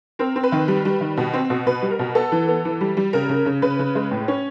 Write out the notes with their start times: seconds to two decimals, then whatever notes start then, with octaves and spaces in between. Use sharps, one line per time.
0.19 C4 A#4
0.36 C4
0.43 B4
0.52 D#3
0.68 G3
0.85 G3
1.01 D#3
1.17 B2
1.33 C4
1.50 B2
1.66 B2 B4
1.82 G3
1.91 A#4
1.99 B2
2.15 B3 A4
2.32 E3
2.48 B3
2.65 E3
2.81 G3
2.97 G3
3.13 C#3 A#4
3.29 C#3
3.46 C#3
3.62 C#3 B4
3.79 C#3
3.95 G#3
4.11 A2
4.28 C#4